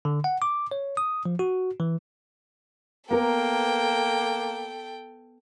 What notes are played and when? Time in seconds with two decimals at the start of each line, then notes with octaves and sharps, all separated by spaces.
0.05 D3
0.24 F#5
0.42 D6
0.71 C#5
0.97 D#6
1.25 F3
1.39 F#4
1.80 E3
3.11 A#3 B3 A4 A#4 G5